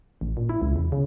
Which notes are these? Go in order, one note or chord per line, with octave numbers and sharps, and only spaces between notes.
A1
A#2
E4
C#2
E2
C#3